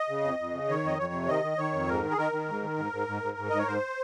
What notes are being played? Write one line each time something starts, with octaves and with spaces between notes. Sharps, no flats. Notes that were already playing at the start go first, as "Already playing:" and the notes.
Already playing: D#5
C#3
F2
F2
C#3
D#3 C#5
F2 D#5
F2 C#5
C3
D#3 D#5
D#3
D#3 C#5
F2
G#2 A#4
D#3
G#4
D#3 A#4
D#3
G#2
D#3
G#2
G#2
G#2
G#2
G#2
G#2 D#5
C#5
G#2 C5